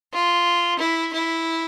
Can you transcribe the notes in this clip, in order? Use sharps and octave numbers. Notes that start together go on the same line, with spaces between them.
F4
E4
E4